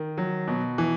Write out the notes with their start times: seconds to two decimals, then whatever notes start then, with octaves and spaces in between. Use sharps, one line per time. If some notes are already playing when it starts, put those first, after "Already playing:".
Already playing: D#3
0.17 F#3
0.48 B2
0.78 E3